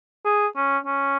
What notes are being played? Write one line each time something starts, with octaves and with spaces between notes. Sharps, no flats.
G#4
C#4
C#4